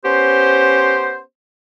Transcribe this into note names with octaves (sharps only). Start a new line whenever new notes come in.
B3 C#4 G4 C5